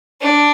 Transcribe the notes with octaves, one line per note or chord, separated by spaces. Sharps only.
D4